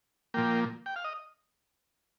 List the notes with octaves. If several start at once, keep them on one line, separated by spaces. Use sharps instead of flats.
A#2 F3 A#3 G5
G5
F5
D#5